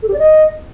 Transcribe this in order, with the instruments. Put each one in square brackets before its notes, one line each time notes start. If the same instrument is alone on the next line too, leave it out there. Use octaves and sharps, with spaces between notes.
[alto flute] A4
G4
D5
D#5